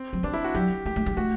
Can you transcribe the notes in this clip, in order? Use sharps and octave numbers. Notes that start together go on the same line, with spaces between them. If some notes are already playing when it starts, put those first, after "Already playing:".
Already playing: C4
F#3
G3 D4
E4
F#4
F#3 G4
A3 G4
A3
G3
A3 F#4